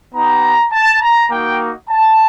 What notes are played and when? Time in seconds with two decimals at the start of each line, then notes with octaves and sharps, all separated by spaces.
0.14 B3 D#4 G4 A#5
0.72 A5
1.01 A#5
1.30 A#3 D#4 F#4 G5
1.89 A5